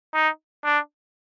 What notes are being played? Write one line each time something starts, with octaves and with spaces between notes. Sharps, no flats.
D#4
D4